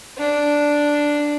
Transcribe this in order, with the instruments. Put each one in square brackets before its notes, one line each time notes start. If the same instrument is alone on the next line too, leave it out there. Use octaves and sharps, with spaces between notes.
[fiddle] D4